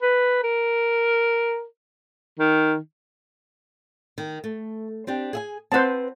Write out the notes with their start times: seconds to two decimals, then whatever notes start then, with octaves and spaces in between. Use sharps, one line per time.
0.02 B4
0.43 A#4
2.39 D#3
4.18 D#3
4.44 A3
5.07 C4 D4 G4
5.33 G#4 E5 G#5
5.72 C4 B4 C5 F#5 A5